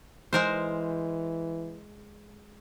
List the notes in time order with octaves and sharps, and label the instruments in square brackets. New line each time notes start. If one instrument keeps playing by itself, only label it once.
[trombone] E3 [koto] G#3 A#4 C5